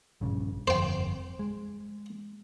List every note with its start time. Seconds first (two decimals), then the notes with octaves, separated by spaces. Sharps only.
0.21 A#1 G2 C#3
0.68 G1 F2 C5 G5
1.39 G#3